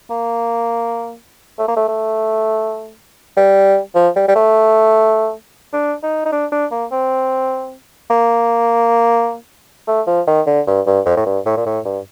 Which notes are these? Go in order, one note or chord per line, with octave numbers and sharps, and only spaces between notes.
A#3
A3
A#3
A3
A3
G3
F3
G3
G3
A3
D4
D#4
D#4
D4
D4
A#3
C4
A#3
A3
F3
D#3
D3
G2
G2
F2
A2
G2
A2
A#2
A2
G2